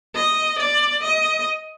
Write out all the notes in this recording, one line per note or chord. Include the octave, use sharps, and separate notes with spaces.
D#5
D5
D#5